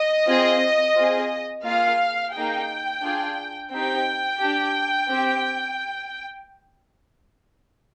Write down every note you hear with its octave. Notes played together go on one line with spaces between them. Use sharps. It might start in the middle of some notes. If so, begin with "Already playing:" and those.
Already playing: D#5
C4 F4 G#4
C4 F4 G#4
A#3 F4 G#4 F5
A#3 D#4 G#4 G5
D4 F4 G#4
C4 D#4 G4 G5
D4 G4
C4 G4